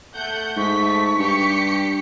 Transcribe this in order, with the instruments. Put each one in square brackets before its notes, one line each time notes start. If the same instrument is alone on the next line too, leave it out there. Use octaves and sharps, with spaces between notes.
[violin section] A3 F#5 G6
[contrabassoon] G#2 [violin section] A3 B6 [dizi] C#6
[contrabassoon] G2 [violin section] G4 B6 C#7